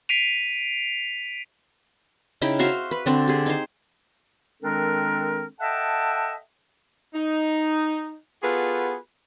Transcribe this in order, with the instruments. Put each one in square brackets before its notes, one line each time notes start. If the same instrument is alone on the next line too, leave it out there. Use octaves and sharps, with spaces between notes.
[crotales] B6 C7 D7 D#7 F7
[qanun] C#3 D#4 E4 G5
F#4 C5 E5 F5
B4
D3 C4 D4
G4 G#4
D#4 C5
[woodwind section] D#3 G#3 C4 D4 A4 A#4
A4 D#5 E5 F#5 G5 A5
[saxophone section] D#4
B3 F4 F#4 G#4 A4 B4